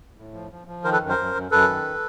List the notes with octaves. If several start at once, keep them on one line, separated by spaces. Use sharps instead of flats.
A2
F3
F3
F3
D#3 A#4 C5
A4 B4
F#2
A#4 C5
F#2
F#2
F#2 A4 B4
D#3